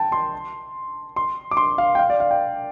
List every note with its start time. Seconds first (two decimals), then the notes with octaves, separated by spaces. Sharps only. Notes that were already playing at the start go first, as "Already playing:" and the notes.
Already playing: G5 A5
0.12 C6
1.16 C6
1.51 D6
1.57 C6
1.78 F5
1.95 G5
1.99 F5
2.10 D5
2.20 F5
2.31 G5